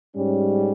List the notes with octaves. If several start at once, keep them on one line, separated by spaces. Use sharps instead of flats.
G#2 G3 C#4